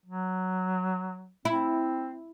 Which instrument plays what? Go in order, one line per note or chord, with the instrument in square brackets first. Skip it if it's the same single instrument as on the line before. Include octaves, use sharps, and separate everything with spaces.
[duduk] F#3
[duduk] C4 [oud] E4